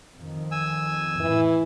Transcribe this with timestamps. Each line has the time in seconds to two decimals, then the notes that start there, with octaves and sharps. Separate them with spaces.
0.18 F2 D#3
0.51 G#5 E6
1.20 A2 E3